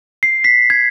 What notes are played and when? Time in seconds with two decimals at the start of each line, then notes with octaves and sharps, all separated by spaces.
0.23 C7
0.44 B6
0.70 G#6